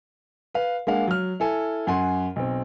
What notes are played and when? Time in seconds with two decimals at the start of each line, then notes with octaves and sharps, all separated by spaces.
0.55 B4 F5
0.87 G#3 A#3 D4 F5 F#5
1.08 F#3 F6
1.40 E4 A4 G#5
1.87 F#2 F#5 G#5 C6
2.36 B1 C4